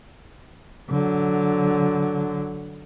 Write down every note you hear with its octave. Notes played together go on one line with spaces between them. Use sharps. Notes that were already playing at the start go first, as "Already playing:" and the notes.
D3 F#3